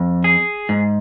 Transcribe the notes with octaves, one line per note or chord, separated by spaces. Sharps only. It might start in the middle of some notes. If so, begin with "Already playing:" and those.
Already playing: F2
G#4
G#2